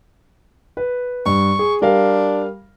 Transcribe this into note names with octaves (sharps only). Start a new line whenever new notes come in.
B4
G2 C#6
G#4
G3 D4 A#4 F5